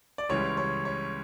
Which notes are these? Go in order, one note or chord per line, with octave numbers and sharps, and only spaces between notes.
D5
C#2 C#3 E3 G3 C#5
C#5
C#5